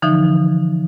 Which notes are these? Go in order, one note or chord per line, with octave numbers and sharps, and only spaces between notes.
D3 E3 F3 D#4